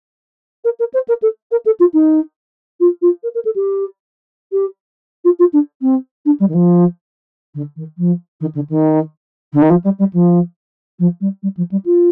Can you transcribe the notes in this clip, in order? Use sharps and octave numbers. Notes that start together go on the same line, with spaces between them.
A#4
A#4
C5
A#4
A4
A#4
A4
F4
D#4
F4
F4
A#4
A#4
A4
G4
G4
F4
F4
D4
C4
D4
G3
D#3
F3
D3
D#3
F3
D#3
D3
D#3
D3
D#3
F3
G3
G3
F3
F3
G3
G3
F3
G3
F4